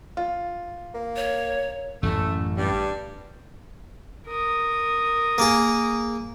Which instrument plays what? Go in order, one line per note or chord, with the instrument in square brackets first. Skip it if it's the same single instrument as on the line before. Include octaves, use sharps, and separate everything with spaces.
[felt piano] F4
[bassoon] A#3
[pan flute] C#5
[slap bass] A1 F#2 [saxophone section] A3
[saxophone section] G2 G3
[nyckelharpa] A#4 D#6
[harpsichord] A#3 G#4